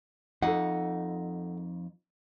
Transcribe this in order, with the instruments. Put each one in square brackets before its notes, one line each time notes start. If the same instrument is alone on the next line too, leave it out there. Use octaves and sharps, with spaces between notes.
[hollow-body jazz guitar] F2 D#4 [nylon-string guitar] A4 F#5